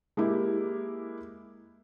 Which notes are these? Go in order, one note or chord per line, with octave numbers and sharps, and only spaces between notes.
G#3 A#3 E4 G4